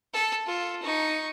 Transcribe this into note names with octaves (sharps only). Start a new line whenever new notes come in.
A4
F4 A4
D#4 C#6